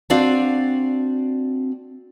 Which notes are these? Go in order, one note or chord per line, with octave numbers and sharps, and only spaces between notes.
C4 D4 F#4 D5 F5